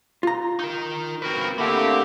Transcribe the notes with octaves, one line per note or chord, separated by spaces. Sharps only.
F4 A#5
D#4 A#4
C4 F#4 A#4 B4
D3 A3 A#3 C4 E4 G4 F#5